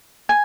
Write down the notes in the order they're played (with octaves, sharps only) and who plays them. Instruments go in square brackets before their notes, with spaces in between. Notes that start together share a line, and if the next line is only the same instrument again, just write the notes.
[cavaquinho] G#5